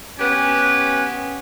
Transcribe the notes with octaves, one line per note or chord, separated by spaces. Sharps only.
B3 C#4 G4 B4 G#5